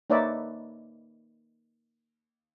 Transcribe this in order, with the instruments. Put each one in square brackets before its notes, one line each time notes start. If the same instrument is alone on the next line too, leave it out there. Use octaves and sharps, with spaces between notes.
[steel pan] A#3 D#4 B4 C#5 D5 E5